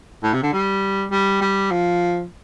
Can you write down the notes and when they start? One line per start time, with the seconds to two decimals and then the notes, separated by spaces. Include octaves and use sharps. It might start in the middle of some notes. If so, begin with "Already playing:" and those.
0.23 A2
0.33 C3
0.43 D3
0.53 G3
1.11 G3
1.41 G3
1.71 F3